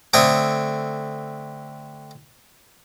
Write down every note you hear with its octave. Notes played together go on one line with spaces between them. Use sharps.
D3 A3 C4 C#5 D#6